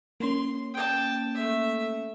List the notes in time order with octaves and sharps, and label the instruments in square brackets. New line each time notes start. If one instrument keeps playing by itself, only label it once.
[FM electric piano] A#3 C#4 [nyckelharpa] C6
[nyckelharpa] G5 A5
A3 E5